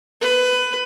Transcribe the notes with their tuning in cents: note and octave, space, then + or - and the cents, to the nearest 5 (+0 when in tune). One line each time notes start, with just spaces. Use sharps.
B4 +20